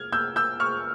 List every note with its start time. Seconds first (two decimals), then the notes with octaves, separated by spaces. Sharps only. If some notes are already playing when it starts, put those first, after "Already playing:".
Already playing: F6 G#6
0.13 E6 G6
0.36 E6 G6
0.60 C#6 F6